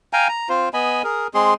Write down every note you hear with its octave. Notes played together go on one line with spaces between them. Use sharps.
F5 G5 G#5 A#5
A#5
C4 F4 C5
B3 D#5 G#5 B5
G#4 A#4
G#3 C4 G#4 C6